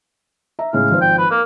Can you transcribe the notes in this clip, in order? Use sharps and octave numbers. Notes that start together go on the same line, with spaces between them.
E5 A#5
A2 C#3 G#3 F5
G#1 F3 C5
G5
B4
A#3 A#4